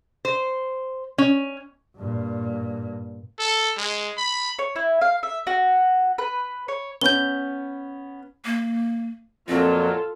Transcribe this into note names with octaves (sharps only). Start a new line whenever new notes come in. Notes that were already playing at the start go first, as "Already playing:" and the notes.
C5
C#4
G2 A#2
A4
G#3
B5
C#5
E4
F5
E5
F#4
B4
C#5
B3 C#4 G6 G7
A#3
F2 A#2 F#3 C4 F4 A4